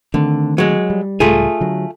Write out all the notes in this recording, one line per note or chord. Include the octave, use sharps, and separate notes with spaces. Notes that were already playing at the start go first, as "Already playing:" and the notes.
D3 D#3 A3 C4
F#3 G#3
G3
C#2 A2 G3 A3 F4 G#4
D3 F#3